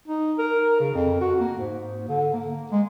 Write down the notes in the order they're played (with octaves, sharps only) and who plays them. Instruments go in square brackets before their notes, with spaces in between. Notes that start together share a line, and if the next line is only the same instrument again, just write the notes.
[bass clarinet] D#4
A#4
C#3
F2
F#4
A#3
G#2
D3
A#3
G#3